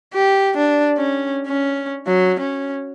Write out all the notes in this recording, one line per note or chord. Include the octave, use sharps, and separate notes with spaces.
G4
D4
C#4
C#4
F#3
C#4